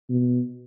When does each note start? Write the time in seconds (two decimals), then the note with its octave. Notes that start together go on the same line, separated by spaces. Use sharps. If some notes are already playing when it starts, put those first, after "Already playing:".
0.09 B2